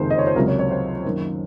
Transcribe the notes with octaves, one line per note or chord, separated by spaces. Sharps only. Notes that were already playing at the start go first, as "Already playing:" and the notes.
Already playing: F#1 F2 C3 D#3 G#3 C5
D#5
C#5
C5
C#2 C3 F#3 A#4
C#5
C#5
C5
F#2 D#3 A#3